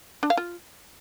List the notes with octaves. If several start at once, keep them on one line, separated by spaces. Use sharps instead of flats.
D4
F5
F4